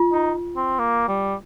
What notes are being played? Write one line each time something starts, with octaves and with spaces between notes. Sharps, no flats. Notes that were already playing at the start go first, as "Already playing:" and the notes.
Already playing: F4
D#4
C4
A#3
G3